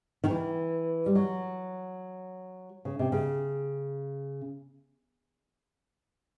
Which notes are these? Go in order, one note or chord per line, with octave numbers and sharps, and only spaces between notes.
D#3
E3
G3
F#3
C#3
C3
C#3